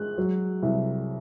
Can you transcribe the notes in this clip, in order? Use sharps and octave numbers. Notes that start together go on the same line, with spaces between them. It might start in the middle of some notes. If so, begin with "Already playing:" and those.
Already playing: G#3 F#6
F#3
C2